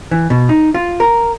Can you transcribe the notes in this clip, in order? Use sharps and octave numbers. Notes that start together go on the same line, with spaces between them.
E3
B2
D#4
F4
A#4